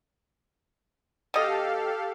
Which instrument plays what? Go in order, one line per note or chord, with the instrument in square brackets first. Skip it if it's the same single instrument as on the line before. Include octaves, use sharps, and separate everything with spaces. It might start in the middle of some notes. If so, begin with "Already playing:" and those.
[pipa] B2 D#5 [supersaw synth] G4 A4 F5